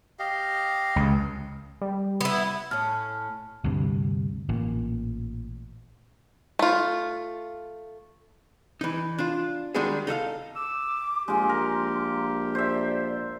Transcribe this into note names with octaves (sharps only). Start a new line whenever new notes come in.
G4 D#5 F5
C#2
G3
B3 E4
A2 C#4 F6
D2 G2 C3
A1 A#2
A3 F4
E3 D#4
D4 F4
D#3 G3 G#3 D4 F#4 G#4
D#4 A4 E5 F5
D6 E6
A#1 G#3 F4 G4 C6
A#4
C5 D5 E5